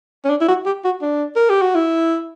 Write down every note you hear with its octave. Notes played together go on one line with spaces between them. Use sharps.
C#4
D4
E4
F#4
G4
F#4
D4
A#4
G4
F#4
E4